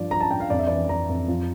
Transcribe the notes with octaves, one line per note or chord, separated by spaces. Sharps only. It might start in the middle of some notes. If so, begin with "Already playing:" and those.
Already playing: G2 F3 D5
F3 A#5
A5
G2 G5
F5
F2 D5
E5
E3 D5
E3 A#5
F2
F3